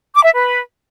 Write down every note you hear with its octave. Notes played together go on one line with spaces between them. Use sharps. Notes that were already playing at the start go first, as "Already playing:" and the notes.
D6
E5
B4